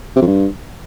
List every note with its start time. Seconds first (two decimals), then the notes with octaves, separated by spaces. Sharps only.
0.16 C3
0.21 F2
0.27 G2